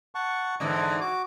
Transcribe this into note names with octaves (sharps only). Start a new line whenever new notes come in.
F#5 A5 C#6
G#2 D3 E3 D5 D#5
F#4 D6